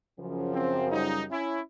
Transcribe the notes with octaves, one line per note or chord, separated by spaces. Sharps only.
F#2 C#3 F3
C4
G3 D#4
C#4 E4